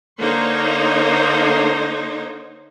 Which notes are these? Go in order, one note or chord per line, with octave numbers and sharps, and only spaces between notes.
D3 A#3 D#4 C5 C#5